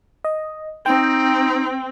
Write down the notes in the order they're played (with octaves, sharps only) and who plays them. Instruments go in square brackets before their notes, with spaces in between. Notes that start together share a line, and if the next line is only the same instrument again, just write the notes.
[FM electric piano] D#5
[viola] C4 [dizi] D#4 [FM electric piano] G5